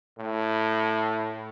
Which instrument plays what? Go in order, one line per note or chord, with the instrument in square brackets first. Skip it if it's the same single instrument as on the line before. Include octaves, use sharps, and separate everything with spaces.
[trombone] A2